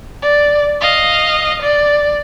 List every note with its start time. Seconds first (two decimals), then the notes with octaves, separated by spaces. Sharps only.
0.22 D5
0.81 D#5 F5
1.62 D5